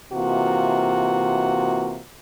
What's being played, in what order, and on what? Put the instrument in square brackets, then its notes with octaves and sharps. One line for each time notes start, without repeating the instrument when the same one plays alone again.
[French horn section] C3 E3 A#3 F4 F#4